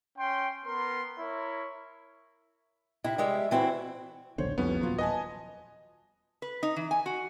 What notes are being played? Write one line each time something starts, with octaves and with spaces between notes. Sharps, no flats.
C#4 G5 C6
B3 A#4 C6
E4 A#4 C#5
C3 E4
G3 G#3 E5
E3 C4 E4 F#4
D#1 B1 D3 C5 C#5
F1 C2 F2 B3 C#4
D#1 F#3 F4
B4 D#5 G#5 A5
B4
D#4
E3
G#5
F#4